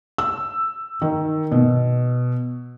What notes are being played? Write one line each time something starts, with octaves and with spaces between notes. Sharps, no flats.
E6
D#3
B2